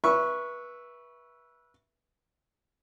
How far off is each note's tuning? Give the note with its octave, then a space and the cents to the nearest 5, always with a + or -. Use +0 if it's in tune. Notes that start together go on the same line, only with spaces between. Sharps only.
B4 -25 E5 +0 C#6 +0